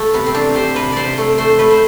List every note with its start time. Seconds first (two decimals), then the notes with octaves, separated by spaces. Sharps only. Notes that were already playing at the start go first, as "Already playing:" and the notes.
Already playing: A3
0.14 C3 B3
0.26 C4
0.34 E3 D4
0.55 C3 C5
0.76 C3 B4
0.92 C3 C5 D5
1.18 A3
1.38 A3 C5
1.59 A3 B4
1.71 C5